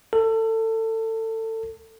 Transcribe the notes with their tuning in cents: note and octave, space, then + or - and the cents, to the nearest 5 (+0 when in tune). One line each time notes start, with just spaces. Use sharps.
A4 +25